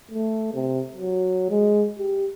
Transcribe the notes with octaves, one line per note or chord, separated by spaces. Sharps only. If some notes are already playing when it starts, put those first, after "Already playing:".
A3
C3
F#3
G#3
G4